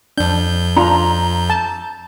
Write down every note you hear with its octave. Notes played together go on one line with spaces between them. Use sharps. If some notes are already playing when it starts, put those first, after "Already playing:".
F2 D4 G6
D4 F4 A#5
A5